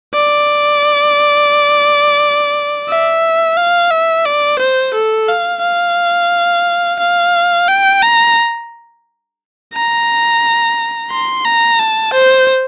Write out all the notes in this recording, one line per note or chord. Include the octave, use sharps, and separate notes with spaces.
D5
E5
F5
E5
D5
C5
A4
F5
F5
F5
G5
A#5
A#5
C6
A#5
A5
C5